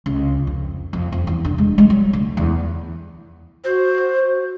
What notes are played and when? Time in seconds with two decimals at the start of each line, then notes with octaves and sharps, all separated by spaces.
0.06 C#2
0.47 F2
0.93 F2
1.12 F2
1.27 E2
1.45 D3
1.58 G#3
1.78 G#3
1.90 F#3
2.13 D2
2.37 E2
3.64 F#4 C5